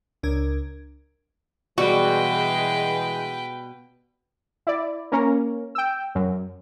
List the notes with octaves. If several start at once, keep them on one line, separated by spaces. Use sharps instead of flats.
C#2 D4 A#4 G#6
B2 E3 G3 G#3 F#4 B4 G5
E4 D5
A#3 C#4 A#4
G5 E6
F#2